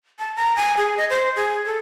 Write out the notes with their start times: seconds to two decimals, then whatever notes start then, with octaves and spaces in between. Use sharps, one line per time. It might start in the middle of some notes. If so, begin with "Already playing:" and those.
0.19 A5
0.36 A#5
0.57 G#5
0.77 G#4
0.97 D#5
1.10 C5
1.36 G#4
1.66 A4